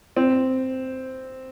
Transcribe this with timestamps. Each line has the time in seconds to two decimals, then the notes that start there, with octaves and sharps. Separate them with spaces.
0.17 C4